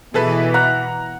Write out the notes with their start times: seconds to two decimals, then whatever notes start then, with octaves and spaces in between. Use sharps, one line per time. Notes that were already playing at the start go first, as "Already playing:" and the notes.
0.14 B2 E3 G#4 A4 B4
0.54 F#5 A#5